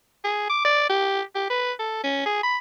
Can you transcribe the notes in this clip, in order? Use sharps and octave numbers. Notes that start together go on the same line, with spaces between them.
G#4
D6
D5
G4
G4
B4
A4
C#4
G#4
B5